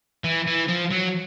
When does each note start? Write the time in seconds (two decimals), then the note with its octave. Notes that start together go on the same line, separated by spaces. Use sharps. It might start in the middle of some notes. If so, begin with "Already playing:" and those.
0.24 E3
0.47 E3
0.69 F3
0.91 F#3